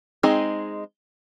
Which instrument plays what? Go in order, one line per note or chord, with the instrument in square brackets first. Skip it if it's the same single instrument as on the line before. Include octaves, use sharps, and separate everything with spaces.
[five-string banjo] G#3 C4 D#4 G#4 D#5